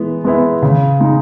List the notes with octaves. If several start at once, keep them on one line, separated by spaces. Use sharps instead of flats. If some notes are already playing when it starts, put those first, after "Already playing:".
Already playing: E3 G#3 B3
G#3 B3 E4
C#3
G#3 D#4